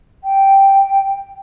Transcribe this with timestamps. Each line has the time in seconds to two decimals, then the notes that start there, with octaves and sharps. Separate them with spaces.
0.24 G5